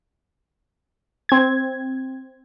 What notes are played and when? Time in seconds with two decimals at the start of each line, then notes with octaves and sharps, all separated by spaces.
1.29 C4 G#6